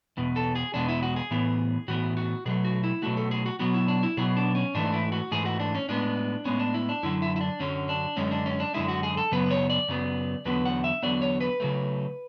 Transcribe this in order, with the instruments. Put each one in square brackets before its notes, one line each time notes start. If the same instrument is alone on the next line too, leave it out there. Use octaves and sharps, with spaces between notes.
[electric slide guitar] E2 B2
A4
G#4
E2 B2 G#3 D4
E4
F#4
G#4
A2 E3 B3
A2 E3 B3 F#4
F#4
B2 F#3 A3 G#4
F#4
E4
B2 F#3 A3 F#4
A4
G#4
F#4
B2 F#3 B3 F#4
E4
D4
E4
B2 F#3 B3 G#4
D4
C#4
G#2 E3 A3 D4
E4
F#4
G#2 E3 A3 G#4
F#4
D4
C#4
A2 G#3 B3 D4
A2 G#3 B3 C#4
D4
E4
D4
F#2 D3 F#3 E4
E4
E4
D4
F#2 D3 F#3 C#4
D4
F#2 D3 G#3 C#4
D4
C#4
D4
F#2 D3 G#3 E4
F#4
G#4
A4
F#2 C#3 F#3 B3 B4
C#5
D5
F#2 C#3 F#3 B3
E2 D3 F#3 B3 B4
F#5
E5
E2 D3 F#3 B3 D5
C#5
B4
C#3 F#3 A3